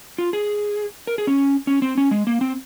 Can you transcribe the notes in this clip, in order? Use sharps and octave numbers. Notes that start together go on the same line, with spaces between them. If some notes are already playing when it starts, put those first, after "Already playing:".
F4
G#4
A#4
G#4
C#4
C#4
C4
C#4
G#3
A#3
C4